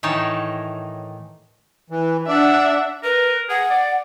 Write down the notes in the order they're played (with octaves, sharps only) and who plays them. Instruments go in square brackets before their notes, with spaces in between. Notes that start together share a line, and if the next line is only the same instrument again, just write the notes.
[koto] A2 D#3 E3 D#4 C#5 A5
[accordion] E3
[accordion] D4 D5 [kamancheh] E5 F#5
[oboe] A#4 [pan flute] B4
[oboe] G#4 [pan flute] F#5
[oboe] D5